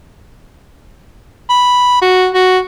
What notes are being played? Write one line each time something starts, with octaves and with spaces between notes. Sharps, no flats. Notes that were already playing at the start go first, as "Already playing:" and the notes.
B5
F#4
F#4